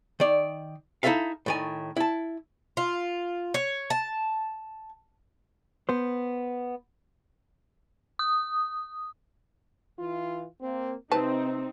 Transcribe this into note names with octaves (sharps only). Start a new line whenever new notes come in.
D#3 D5
D#4 E4 G#4 A4 E5 F5
A2 D#3 G#5
E4 A5
F4
C#5
A5
B3 C5
D#6
E3 F4
A#3 C4
C3 C4 D#4 B4 A5